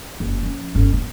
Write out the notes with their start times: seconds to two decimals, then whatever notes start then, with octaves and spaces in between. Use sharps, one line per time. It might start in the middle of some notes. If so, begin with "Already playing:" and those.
0.20 F#1
0.43 F3 C#4
0.75 G1 C#4
0.94 B3